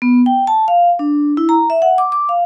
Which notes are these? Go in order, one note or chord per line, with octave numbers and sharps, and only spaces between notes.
B3
G5
A5
F5
D4
E4
A#5
E5
F#5
D6
D6
F5